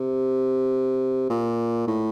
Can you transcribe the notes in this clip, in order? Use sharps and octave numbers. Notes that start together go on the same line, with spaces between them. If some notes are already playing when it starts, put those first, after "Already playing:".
Already playing: C3
A#2
A2